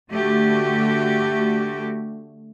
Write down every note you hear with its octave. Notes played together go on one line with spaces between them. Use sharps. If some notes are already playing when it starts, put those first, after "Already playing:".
D3 A3 F#4 G4